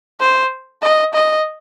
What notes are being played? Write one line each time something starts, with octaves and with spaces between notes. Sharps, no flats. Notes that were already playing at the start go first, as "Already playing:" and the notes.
C5
D#5
D#5